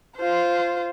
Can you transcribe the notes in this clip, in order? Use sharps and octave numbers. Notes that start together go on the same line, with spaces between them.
F4 C5